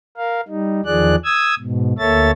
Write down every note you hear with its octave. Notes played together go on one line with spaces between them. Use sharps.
A#4 F5
G3 D#4
E2 D#3 F3 G#4 D5 F#6
D#6 E6 G#6
G#2 B2
D2 A#3 A4 C#5 E5 A6